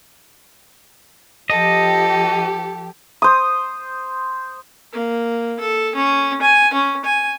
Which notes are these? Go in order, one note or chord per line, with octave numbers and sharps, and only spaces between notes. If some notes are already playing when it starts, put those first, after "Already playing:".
F3 G4 A4 D#5
C5 D#6
A#3
A4
C#4
G#5
C#4
G#5